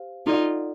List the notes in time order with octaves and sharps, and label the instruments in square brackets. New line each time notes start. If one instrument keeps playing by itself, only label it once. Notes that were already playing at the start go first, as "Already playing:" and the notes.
Already playing: [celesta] G4 C5 F5
[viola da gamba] D#4 F4 [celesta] A4 D5 F#5